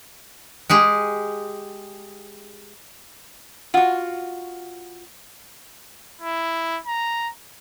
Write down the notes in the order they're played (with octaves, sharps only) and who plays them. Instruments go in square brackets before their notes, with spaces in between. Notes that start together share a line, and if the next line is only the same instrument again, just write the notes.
[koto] G#3 G4 G#4
[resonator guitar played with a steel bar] F4 F#4 [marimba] F#5
[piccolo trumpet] E4
A#5